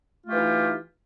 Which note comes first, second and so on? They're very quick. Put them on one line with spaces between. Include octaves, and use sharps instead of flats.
F4 A3 G4 E3 D#4